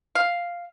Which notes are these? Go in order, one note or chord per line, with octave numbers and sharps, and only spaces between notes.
F5